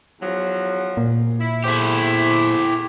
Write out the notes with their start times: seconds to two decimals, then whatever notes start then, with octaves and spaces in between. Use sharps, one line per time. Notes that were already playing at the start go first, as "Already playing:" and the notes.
0.21 E2 F3 F#3
0.97 A#2
1.40 E4
1.64 E2 A3 E4 G4 C5